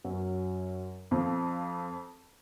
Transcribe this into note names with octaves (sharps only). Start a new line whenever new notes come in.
F#2 F#3
F2 F3